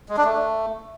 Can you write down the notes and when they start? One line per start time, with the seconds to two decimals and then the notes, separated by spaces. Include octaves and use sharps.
0.09 G#3
0.17 D4
0.25 A3